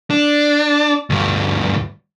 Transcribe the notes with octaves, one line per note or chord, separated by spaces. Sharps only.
D4
D2 G2